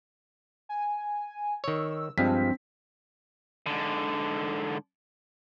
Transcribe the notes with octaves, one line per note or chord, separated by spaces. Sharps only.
G#5
D#3 C#5 E6
G2 F3 G#3 C4 D4 B6
G#2 D3